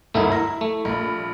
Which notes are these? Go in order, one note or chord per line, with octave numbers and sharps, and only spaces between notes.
G#1 D2 G2 A3 D#4 E4
E4 A#5
A3
A#1 B5